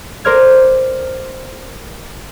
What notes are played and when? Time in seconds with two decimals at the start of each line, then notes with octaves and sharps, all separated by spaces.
0.25 A#4 C5 D5 F6 G#6